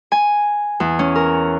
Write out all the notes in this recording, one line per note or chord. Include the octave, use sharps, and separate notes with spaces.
G#5
E2
C#4
A#4